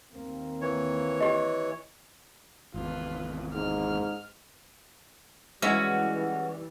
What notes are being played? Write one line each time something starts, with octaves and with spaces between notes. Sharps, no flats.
D#2 A#3 C4
E3 C#5
G4 D#5
G#1 E2 F4 B4
G#2 F6
E3 G3 G#3 C#4 E4 F#4 E6